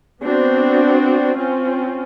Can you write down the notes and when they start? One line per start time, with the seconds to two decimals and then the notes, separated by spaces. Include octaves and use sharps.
0.21 B3 C4 D4 F#4
1.37 C4 C#4 F4